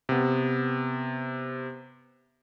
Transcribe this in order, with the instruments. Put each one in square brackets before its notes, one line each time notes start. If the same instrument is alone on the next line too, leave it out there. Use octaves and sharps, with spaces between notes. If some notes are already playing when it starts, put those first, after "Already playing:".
[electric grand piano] C3 B3